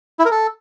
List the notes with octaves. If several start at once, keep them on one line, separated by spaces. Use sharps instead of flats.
E4
A#4
A4